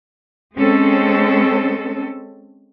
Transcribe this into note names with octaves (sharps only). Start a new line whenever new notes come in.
G#3 C4 C#4 A4